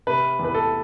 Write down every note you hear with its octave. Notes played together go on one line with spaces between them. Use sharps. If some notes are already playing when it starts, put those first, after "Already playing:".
C3 B4
E2
B4
A4